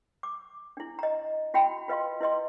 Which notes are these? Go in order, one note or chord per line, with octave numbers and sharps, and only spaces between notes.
D6
D4 E4
D#5 A#5
E4 F#4 G5 B5
F4 B4 D#5 F5 C6
E4 B4 D#5 C6